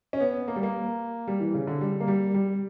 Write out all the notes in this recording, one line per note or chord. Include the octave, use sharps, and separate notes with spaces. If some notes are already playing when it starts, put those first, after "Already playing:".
C#4
B3
A#3
G3
A#3
G3
E3
C#3
D3
G3
A#3
G3
G3